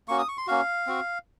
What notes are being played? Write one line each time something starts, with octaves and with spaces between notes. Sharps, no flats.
A#3 C#4 F#4 C#6
D#6
C#6
C6
A#3 C#4 F#4 F5
C4 F#4